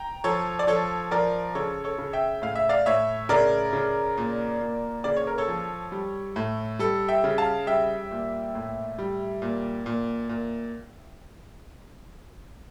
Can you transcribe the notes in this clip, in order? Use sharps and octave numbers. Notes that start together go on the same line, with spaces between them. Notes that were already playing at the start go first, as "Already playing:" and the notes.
Already playing: G5 A#5
F3 A4 C#5
D5
F3 A4 C#5
F3 A#4 D5
C#3 A4 C#5
A4 C#5
C#3
E5 G5
A2 F5
E5
D5 F5
A2 C#5 E5
C#3 A#4 D5
C#3
A#2
A#2
C#3 D5
C#5
A#4
A4 C#5
F3
G3
A2
G3 A4
E5 G5
C#3
F5 A5
G3 E5 G5
A#2
A2
G3
A#2
A#2
A#2